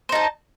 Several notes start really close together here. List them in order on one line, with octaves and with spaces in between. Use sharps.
C5 D#4 A5